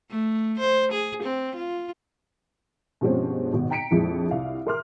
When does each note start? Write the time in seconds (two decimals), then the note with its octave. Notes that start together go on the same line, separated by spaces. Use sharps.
0.10 A3
0.59 C5
0.92 G#4
1.23 C4
1.56 F4
3.01 G2 B2 F3 G#3 C4 C#4
3.53 G#1 G#2 B2
3.70 G5 A#5 B6 C#7 D7
3.91 A#1 F2 G#3 E4 G#4
4.31 C2 F5
4.66 G#4 A#4 E5 C6 D6 F6